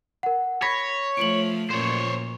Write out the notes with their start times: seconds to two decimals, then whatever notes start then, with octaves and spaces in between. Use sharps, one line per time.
0.23 A#4 F#5
0.62 C#5 B5 A#6 B6
1.17 F3 A3 D7 F#7
1.71 F#2 A#2 F3 C5 C#5